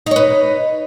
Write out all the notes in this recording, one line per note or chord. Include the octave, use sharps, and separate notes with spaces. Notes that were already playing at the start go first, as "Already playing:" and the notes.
D#4 B4 C#5